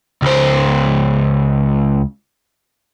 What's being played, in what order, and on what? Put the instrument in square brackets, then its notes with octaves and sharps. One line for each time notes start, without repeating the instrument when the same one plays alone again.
[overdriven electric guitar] C#2 C5